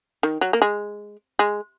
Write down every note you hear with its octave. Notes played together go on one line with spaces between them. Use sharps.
D#3
F#3
A#3
G#3
G#3